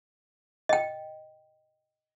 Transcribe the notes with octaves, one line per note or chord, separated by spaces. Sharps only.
D#5 G5